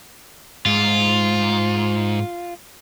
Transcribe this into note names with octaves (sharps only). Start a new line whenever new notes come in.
G#2 F4